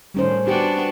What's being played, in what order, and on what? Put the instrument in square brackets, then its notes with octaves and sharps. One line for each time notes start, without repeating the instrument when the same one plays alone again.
[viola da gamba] A2 D#3 [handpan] G3 C#4 C5
[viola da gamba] B3 D4 F#4 [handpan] G4